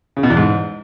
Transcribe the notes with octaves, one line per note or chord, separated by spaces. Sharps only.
C#3
B2
E2
G#2